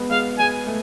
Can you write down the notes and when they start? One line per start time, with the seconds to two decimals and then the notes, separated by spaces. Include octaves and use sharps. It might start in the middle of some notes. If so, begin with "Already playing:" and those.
Already playing: G#3 B3
0.10 G#3 F5
0.39 G#3 G#5
0.67 A3